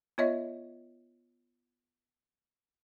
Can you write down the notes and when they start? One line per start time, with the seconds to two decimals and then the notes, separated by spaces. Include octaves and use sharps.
0.18 B3 F4 C#5 D#5 E5